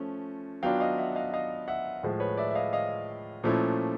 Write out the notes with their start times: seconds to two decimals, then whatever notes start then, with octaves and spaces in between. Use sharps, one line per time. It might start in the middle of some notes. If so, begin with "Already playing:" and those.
Already playing: F3 A3 C#4
0.63 F#3 B3 D4 F4 F5 G5
0.80 D#5 F5
0.98 E5 F#5
1.15 D#5 F5
1.34 D#5 F5
1.68 E5 F#5
2.03 A2 F3 G#3
2.20 B4 C#5
2.37 D5 E5
2.51 E5
2.55 D#5 F5
2.73 D#5 F5
3.43 A#2 F3 A3 C#4 E4